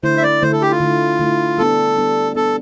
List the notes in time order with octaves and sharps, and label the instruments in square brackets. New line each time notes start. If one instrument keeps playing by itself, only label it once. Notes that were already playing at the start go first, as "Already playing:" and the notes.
[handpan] D3 A3 E4 [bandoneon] C5
[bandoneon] E5
D5
[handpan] D3 A3 E4 [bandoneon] C5
[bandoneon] A4
G4
F4
[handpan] D3 A3 E4
D3 A3 E4
[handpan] G3 B3 D4 [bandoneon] A4
[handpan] G3 B3 D4
[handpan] G3 B3 D4 [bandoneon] A4